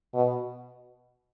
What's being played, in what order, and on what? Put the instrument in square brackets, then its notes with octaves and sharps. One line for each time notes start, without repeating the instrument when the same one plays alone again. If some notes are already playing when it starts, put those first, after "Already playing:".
[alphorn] B2